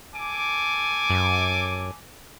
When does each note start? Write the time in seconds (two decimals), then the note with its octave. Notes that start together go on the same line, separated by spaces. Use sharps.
0.15 A4 G#5 D6
1.10 F#2